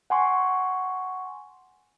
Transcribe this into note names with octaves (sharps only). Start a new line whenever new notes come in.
F#5 G#5 C6 C#6